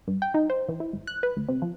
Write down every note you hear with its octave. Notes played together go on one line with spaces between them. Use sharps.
G2
G5
D#4
C5
E3
E4
G#1
F#6
B4
D2
C3
F3